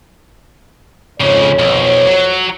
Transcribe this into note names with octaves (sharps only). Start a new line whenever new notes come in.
F2 G#2 C#3 C#5
B1
F#3